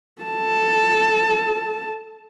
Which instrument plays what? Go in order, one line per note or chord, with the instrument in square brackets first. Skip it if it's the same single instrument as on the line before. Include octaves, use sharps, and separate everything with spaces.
[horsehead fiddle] A4 A5